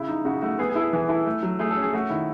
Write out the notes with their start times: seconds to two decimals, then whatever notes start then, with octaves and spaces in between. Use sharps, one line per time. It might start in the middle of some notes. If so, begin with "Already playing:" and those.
Already playing: C#3 E4
0.08 D#4
0.25 C#3 F#4
0.41 A3 F#4
0.59 B3 G#4
0.70 G#4
0.75 E4 A4
0.81 G#4
0.93 E3 G#4
1.09 E4 A4
1.26 A3
1.43 F#3
1.59 A3 G#4
1.70 A4
1.77 C#4
1.82 G#4
1.93 A3 F#4
2.10 D#3 E4